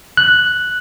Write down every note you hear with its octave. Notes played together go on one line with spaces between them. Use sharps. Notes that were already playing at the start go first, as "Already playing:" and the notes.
F#6